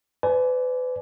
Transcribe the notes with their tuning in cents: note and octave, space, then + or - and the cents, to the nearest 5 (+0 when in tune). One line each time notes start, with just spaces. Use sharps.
B4 +35 D5 -15 G#5 +25